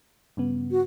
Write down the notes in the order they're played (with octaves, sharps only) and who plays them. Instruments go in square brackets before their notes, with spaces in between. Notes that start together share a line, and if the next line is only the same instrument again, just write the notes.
[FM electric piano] G2 C#3 B3
[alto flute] F#4